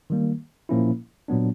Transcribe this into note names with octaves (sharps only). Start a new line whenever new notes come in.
D#3 G3 A#3
A#2 F3 A#3 C#4 E4
A#2 F#3 B3 D4